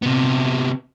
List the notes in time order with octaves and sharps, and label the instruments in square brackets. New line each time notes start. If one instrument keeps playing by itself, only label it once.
[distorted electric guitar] C3 B3